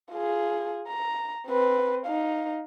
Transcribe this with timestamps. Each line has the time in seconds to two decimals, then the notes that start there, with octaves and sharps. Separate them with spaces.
0.11 F4 G#4
0.87 A#5
1.47 C4 B4
2.06 D#4 F5